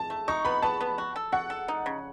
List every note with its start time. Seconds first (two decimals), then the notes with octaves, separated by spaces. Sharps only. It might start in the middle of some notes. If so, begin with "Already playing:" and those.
Already playing: A5
0.10 A3
0.28 D#4 C#6
0.45 B3 B5
0.62 B3 A5
0.81 B3
0.98 F#4
1.16 A4
1.32 F#4 F#5
1.50 A4
1.68 D#4
1.86 C#3